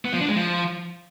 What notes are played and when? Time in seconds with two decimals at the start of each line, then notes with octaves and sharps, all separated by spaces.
0.05 B3
0.13 F3
0.21 D4
0.29 G#3
0.37 F3